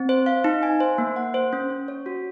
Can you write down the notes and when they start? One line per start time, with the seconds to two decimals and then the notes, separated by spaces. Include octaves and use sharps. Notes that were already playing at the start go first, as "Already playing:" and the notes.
Already playing: C4
0.09 C5
0.26 F5
0.44 D#4
0.63 G#5
0.80 C5
0.98 A#3
1.16 F#5
1.34 C5
1.53 C#4
1.70 C#4
1.88 C#5
2.06 F#4